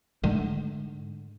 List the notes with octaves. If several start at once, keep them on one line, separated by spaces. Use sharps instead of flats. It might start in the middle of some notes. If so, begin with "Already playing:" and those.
G#2 D3 G#3 A3